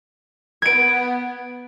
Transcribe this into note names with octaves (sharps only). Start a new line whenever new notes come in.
B3 G#6 D7